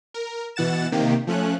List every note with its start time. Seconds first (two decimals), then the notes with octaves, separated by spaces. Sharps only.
0.14 A#4
0.56 B2 E3 F#5 A6 E7
0.92 C3 D#3 A#3 G4
1.27 F3 A3 C#4 F#6